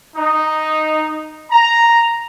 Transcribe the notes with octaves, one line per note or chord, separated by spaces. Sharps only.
D#4
A#5